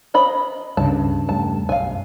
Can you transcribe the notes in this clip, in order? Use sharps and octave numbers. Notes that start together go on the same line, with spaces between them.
C5 D#5 B5
C#2 G2 C#3 A5
E2 G3 A3 A5
B1 F#2 F5 G#5